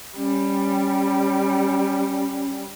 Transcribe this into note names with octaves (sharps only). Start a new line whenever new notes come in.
G3 C#4